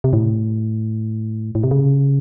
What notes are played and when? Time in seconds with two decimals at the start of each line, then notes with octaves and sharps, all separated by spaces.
0.04 C3
0.13 A2
1.55 A2
1.63 C3
1.71 C#3